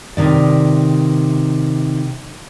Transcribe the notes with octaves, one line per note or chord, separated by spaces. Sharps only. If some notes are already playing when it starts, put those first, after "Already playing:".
C3 D#3 D5